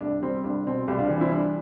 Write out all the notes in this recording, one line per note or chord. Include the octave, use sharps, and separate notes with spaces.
C2 D4
G3 C4
C2 D4
B2 C4
C2 G4
D4 F4
E3 D4
C4 E4
G3 D4